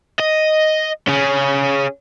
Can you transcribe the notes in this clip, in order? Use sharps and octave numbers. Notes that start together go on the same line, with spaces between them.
D#5
C#4 G#4